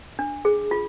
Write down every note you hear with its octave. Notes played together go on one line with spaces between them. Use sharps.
D4
G#4
F4